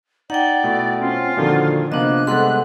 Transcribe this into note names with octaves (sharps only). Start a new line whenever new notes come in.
D#4 D5 F#5 G5
B2 A3 E4
C4 C#4 F4
A#2 D3 D#3 F3 F#4
C3 F3 A#3 B3 D4 D#5 F#6
C3 G3 G#3 B3 A4 F#5 C6